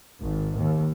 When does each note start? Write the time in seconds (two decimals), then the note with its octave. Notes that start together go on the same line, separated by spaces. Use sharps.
0.19 G#1
0.56 D#2